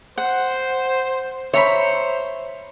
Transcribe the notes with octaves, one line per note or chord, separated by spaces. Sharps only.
C5 F#5
C5 C#5 E5 A#5 B5